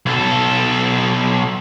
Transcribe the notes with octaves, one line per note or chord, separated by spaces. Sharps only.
B1 A4